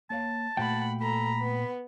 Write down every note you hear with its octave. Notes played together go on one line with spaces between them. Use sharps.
A#3 C#5 F5 A5
A#2 A3 F#4 F#5 G5 B5
A4 A#5 B5
B3